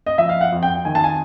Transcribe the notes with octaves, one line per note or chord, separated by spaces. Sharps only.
D#5
F3 E5
F5
F#5
F2
G5
D#3 G#5
A5
G#5